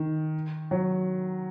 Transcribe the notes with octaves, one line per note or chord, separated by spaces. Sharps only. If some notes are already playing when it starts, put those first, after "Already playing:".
Already playing: D#3
F#3